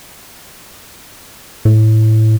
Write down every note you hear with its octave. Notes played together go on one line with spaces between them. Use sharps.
A2